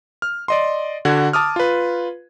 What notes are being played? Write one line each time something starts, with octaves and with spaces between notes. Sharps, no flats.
F6
D5 D#5 C6
D3 F#4 F#5 G#6
A5 D6 D#6 F6
F4 B4